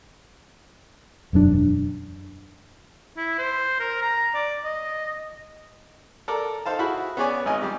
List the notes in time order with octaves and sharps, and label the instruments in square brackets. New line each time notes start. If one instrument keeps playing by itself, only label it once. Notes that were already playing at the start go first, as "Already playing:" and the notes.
[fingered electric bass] E1 F#2 A3 D4
[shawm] E4
C5
A#4
A#5
D5
D#5
[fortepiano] A4 A#4 D5
D#4 A4 C5 F5 A5
E4 F#4 G#4 F#5 B5
B3 C#4 G#4 C#5 D5 G#5
G#1 D#4 D#5 G#5
G3 G4